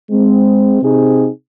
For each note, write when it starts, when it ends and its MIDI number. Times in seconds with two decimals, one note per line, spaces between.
0.11 0.78 56
0.11 0.78 60
0.83 1.28 48
0.83 1.28 60
0.83 1.28 63
0.83 1.28 68